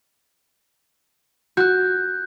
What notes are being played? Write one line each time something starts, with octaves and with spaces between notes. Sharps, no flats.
F#4 F#6 G6